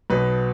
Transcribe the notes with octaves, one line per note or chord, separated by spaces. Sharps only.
B1 B2 B4